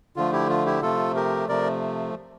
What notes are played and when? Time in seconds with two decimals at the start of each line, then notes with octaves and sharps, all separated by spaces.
0.16 D3 F3 A3 F4
0.33 E4 G4
0.49 F4
0.66 E4 G4
0.82 C3 F3 A3 F4 A4
1.15 G4 A#4
1.48 C3 F3 A3 A#4 D5